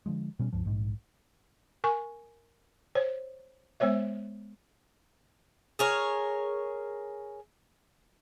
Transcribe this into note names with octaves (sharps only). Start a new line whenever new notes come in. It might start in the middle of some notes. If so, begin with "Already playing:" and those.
D3 F3 G#3
B2 G3 C#4
C#2 G2 F3
A#1 G#2
A#4 G#5 C#6
C5 C#5
G#3 B3 C5 C#5 E5
G#4 A#4 C#5